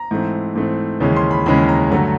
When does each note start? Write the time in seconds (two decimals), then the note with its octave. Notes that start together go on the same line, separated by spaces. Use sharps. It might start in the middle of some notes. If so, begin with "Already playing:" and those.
Already playing: A#5
0.11 G#2 E3 A3 C4
0.55 G#2 E3 A3 C4
1.00 D#2 C#3 E3 G#3 C#4
1.16 C6
1.31 B5
1.46 D#2 C#3 E3 G#3 C#4 B5
1.69 A#5
1.91 G2 D3 F#3 A3 A#5